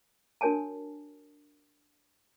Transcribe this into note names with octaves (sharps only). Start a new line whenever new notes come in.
D4 F#4 A#4 C#5 G#5 A5